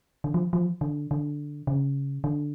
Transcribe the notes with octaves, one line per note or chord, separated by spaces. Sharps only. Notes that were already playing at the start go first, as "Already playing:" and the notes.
D3
F3
F3
D3
D3
C#3
D3